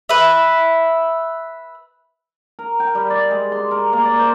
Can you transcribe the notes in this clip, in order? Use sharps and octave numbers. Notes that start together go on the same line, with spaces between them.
B4 E5
A#4
G5
G3
D5
G#3
C6
A#4
A#3
D5
C5